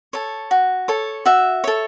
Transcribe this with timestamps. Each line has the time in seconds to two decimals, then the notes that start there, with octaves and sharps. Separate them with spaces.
0.13 A4 C#5
0.51 F#4
0.88 A4 C#5
1.25 F#4 E5
1.64 A4 C#5